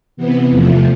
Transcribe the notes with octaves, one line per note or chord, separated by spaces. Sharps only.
C3 E3 B3
E2 C3 F3 A3